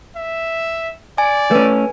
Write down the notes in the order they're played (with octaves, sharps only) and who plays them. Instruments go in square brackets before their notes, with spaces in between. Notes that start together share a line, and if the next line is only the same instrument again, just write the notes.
[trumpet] E5
[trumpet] D5 [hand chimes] G#5
[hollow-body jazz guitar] A3 C#4 [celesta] B4